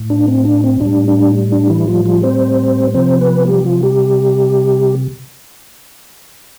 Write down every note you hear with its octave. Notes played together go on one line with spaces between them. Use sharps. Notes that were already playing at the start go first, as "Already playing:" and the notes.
Already playing: A2
D4
C4
D4
C4
A2 G3 D4
D4
D4
E3 E4
F3 F4
F3 F4
C4 C5
C3 F3 C4 C5
B3 B4
G3 G4
F3 F4
G3 G4